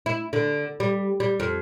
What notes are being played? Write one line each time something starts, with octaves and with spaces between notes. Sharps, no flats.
E4
D3
G3
G3
F2